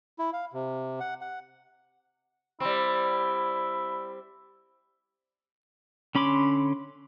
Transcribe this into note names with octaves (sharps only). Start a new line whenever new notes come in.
E4
F5
C3
F#5
F#5
G3 C4 E4
D3 C#4 B5 C6 D6